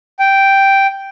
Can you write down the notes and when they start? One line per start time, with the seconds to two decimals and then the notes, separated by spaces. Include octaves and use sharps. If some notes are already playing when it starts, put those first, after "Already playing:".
0.19 G5